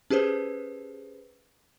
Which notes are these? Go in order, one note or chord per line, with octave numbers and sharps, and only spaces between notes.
C#4 G4 G#4 B4 C5